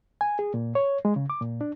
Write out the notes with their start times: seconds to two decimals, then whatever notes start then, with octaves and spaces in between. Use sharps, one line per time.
0.21 G#5
0.39 G#4
0.54 A#2
0.75 C#5
1.05 G#3
1.16 C#3
1.30 D6
1.41 A#2
1.61 D4